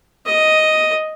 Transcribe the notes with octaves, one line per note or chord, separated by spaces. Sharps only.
D#5